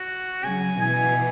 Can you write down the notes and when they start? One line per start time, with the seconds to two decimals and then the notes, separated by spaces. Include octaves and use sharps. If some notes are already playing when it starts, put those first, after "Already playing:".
Already playing: F#4
0.44 C#3 F#3 G#5
0.80 B2 E3 G#5